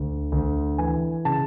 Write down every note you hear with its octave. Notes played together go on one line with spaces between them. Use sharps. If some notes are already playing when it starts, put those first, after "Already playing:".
Already playing: D2
D2
E3 G#5
C#3 A5